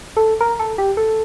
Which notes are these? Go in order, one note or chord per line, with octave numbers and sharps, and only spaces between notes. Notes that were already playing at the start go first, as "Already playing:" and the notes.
A4
A#4
A4
G4
A4